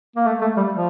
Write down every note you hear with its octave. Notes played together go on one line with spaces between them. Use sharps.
A#3
A3
A3
G3
F3